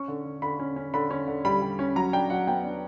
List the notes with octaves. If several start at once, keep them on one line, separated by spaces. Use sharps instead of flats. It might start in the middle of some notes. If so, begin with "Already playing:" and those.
Already playing: C#4 C#6
D3
D3
D3 B5
C#4
C#4
D3 B5
C#4
D3
G3 B5
G3
C#4
F#3 A#5
D4 G5
F#3 F#5
B3 G5
D4